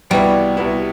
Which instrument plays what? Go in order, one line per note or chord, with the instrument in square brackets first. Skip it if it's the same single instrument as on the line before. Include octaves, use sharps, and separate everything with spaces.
[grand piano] C2 B2 B3 E4 [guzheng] G3
[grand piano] C2 B2 B3 E4